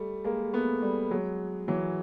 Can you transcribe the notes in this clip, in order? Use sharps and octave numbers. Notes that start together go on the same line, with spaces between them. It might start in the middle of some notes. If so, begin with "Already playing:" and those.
Already playing: G3 A3
G#3 A#3
A3 B3
G3 A3
F#3 G#3
E3 F#3